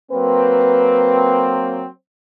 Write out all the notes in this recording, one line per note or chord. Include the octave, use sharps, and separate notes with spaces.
F#3 A#3 C4 B4